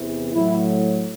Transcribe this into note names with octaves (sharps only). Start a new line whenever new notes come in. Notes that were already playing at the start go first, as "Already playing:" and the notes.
Already playing: E2 C3 E3
A2 F#3 E4